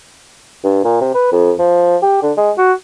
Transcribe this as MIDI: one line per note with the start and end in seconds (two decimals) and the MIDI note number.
0.64 0.82 43
0.84 0.99 46
1.01 1.12 48
1.15 1.28 71
1.32 1.53 41
1.59 1.97 53
2.03 2.20 67
2.23 2.32 50
2.37 2.52 56
2.58 2.73 66